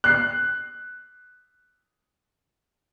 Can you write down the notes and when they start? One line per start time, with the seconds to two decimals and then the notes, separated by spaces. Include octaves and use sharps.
0.04 F#6 C7